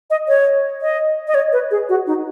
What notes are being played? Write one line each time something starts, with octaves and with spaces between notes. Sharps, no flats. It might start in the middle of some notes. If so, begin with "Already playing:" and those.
D#5
C#5
D#5
D#5
C#5
B4
G#4
F#4
D#4